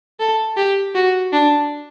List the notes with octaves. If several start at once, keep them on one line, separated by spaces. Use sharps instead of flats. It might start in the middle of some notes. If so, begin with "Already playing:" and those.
A4
G4
F#4
D4